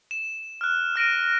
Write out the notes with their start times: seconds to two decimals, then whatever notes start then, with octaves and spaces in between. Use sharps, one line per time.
0.11 E7
0.61 F6 F#6
0.96 F6 A#6 D7 D#7